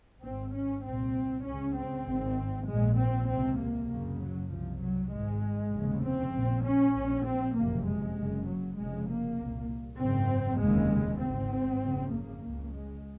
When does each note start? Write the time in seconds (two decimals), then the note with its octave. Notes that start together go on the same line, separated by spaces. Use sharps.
0.23 G#1 G#2 C4
0.53 C#4
0.84 C2 A#2 C4
1.45 C#2 C#3 C#4
1.75 C4
2.06 G#1 G#2
2.67 A#1 A#2 G#3
2.98 C4
3.28 C#2 C3 C4
3.58 A#3
3.89 F#1 F#2 C#3
4.20 F#3
4.50 C2 C3 F3
4.80 F#3
5.11 G#1 G#2 G#3
5.72 F1 D#2 C#3
6.03 C4
6.33 A#1 A#2
6.63 C#4
6.94 A#1 A#2
7.24 C4
7.55 F#1 F2 C3 A#3
7.86 G#3
8.16 F#1 F#2 C#3
8.47 F#3
8.77 F1 F2 C#3 G#3
9.08 A#3
9.38 C2 A#2
9.99 G#1 F#2 C#3 C4
10.60 F1 D#2 C#3 G#3
11.21 G#1 G#2 C4
11.82 F#1 F2 C#3
12.12 A#3
12.43 C#2 C#3
12.73 G#3